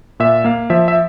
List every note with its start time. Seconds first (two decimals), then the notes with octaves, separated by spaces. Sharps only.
0.20 A#2 E5
0.44 A#3 F5
0.70 F3 E5
0.88 E5